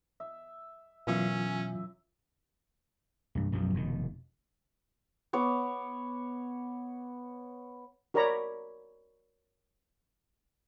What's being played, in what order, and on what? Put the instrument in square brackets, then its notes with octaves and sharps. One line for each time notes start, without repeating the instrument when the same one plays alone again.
[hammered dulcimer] E5
[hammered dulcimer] F#2 E5 [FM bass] B2 [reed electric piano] E3 F#3 F4 [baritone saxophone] C#4
[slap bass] C2 G2
B1 F#2 B2 F3
F1 B2 D#3
[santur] B3 C#5 D6
[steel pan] F#4 A#4 C#5 D5 A#5 B5